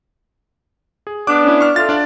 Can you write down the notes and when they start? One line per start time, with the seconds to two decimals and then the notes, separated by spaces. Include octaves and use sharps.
1.07 G#4
1.27 B3 D4 D6 F#6
1.44 C#4 E4
1.60 C#6 F6
1.76 A3 F4 A6
1.89 D4 D5 F5